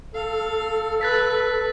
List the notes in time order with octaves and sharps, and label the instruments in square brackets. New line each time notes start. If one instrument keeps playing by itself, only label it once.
[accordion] A4 [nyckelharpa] F5
[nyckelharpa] B4 [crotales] F#6 A6 B6